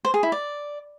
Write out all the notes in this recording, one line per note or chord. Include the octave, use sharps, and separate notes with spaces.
C5
G#4
E4
D5